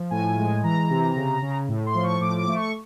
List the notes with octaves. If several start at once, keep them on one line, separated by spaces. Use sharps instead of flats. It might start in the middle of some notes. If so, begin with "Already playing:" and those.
Already playing: F3
A2 G#5
G#3
E3 A#5
C3
C#3
C#3
A2
C6
F3
C#6
A2 D6
D6
A3
C#6